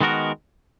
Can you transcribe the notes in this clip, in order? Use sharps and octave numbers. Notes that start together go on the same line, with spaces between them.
D#3 G#3 B3 F#4 A#4